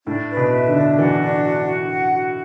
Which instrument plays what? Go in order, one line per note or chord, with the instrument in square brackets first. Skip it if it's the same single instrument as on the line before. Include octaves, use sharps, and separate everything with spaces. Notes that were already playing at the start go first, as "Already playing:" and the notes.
[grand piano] A2 [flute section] D4
[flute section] B4
[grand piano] B2
[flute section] E5
[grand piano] D3
[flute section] D4
[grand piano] E3 [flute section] F#4
[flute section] D4
F#4
F#4
F#5
F#4